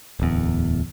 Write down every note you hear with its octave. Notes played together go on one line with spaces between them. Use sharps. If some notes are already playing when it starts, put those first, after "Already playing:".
D1 E2